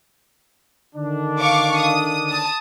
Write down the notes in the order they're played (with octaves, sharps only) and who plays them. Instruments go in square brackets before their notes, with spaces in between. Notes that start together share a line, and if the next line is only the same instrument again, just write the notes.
[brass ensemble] D3 D#3 D4
[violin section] F5 C#6 D6
D#6
A5 D#6